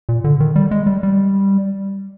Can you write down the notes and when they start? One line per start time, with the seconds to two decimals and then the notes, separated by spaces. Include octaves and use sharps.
0.09 A#2
0.24 D3
0.40 D#3
0.56 G3
0.71 G#3
0.86 G3
1.03 G3